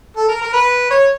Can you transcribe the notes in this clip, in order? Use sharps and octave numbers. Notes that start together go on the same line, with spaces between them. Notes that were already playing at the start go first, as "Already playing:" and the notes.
A4
A#4
A#4
B4
C#5